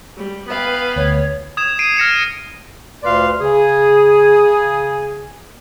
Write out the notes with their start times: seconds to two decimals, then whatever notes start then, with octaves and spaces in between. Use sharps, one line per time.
0.16 G3
0.48 B3 B4 F5 G5
0.96 D2 C#5
1.57 D#6 G#6 E7
1.79 C7 D7 D#7
1.97 F6 A#6 C#7 E7
3.03 D2 A#2 B4 D5 F5 C6
3.40 C#3 G#4